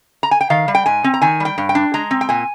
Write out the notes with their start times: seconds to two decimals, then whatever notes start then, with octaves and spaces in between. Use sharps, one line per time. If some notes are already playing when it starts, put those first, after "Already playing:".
0.23 A#5
0.31 G#5
0.41 G5
0.50 D#3 F5
0.68 G3
0.75 G5
0.86 G#2 G#5
1.04 C4
1.14 A#5
1.22 D#3 G#5
1.40 G3 G5
1.58 G2
1.69 G5
1.75 D4
1.94 G#3 A#5
2.11 C4
2.21 G5
2.29 A#2 G#5